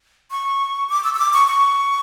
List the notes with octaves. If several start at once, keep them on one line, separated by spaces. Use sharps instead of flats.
C#6
D6
E6
E6
D6
C#6
C#6